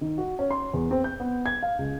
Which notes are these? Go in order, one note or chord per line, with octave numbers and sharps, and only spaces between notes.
D#3
F#4
C#4
C6
E2
C4
G6
B3
G#6
F5
C#2